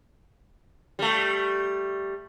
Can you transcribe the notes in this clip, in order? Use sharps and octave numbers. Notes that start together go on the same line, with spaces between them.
G3 A3